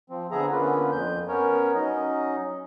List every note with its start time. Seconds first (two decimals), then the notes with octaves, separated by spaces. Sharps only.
0.10 F3 C4
0.31 D3 B3 G#4 E5 A#5
0.51 D3 A#3 B3 C#4 F4 B4
0.92 F2 G6
1.28 B3 C#4 A#4 C#5
1.75 F#3 C#4 D#4 D#5